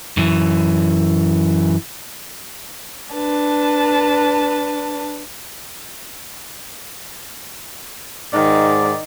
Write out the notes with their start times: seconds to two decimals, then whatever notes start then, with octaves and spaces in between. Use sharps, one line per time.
0.17 F#2 E3
3.13 D4 B4 A5
8.33 G#2 D#3 D5